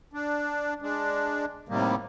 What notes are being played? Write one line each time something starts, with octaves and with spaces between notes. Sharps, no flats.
D4
G#3 D4
A2 C3 D#3 G3 A#3